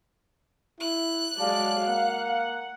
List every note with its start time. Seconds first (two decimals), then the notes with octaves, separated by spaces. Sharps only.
0.80 E4 F#6
1.40 F#3 G#3 D5 F5 A5
1.88 A#3 F#5